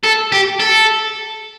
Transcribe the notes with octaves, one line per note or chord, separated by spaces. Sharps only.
A4
G4
A4